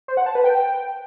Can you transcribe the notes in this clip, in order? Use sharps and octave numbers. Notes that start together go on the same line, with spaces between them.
C5
F#5
A5
B4
G5